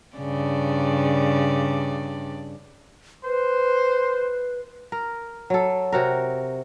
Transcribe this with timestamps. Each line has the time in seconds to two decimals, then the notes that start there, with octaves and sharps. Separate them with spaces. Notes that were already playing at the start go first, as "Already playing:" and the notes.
0.17 G2 C#3 D5
3.24 B4 C5
4.92 A#4
5.50 F#3 A4
5.92 C3 F#4 A#4